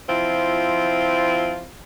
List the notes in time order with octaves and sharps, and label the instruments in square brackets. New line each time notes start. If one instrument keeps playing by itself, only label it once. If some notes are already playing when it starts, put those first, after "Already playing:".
[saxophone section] F3 C4 E4 F4